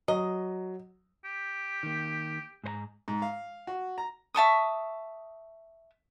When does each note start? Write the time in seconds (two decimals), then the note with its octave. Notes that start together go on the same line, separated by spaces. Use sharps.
0.08 F#3 D#5
1.25 G4
1.83 D#3 A#3
2.64 G#2 C5 A#5
3.08 G#2
3.22 F5
3.67 F#4
3.98 A#5
4.34 E5 A5 C#6 D#6